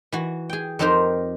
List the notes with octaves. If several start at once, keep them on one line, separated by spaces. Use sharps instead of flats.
E3 F#4
G#4 G5
F2 C4 D#4 G4 A#4 C5